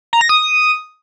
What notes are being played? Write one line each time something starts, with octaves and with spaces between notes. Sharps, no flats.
A#5
A#6
D#6